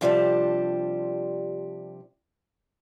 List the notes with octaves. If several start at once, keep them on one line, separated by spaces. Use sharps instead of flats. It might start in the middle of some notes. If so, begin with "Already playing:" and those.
C3 F3 G3 D4 G4 A4